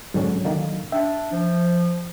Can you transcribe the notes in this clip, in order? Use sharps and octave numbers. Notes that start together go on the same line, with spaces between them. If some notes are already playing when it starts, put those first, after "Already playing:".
G#2 D3 F#3 C#4
D3 D#3 A#3
D4 E5 G5
F3